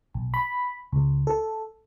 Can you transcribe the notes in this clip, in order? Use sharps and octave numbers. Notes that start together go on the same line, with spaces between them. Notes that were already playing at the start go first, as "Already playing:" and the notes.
B1
B5
C#2
A4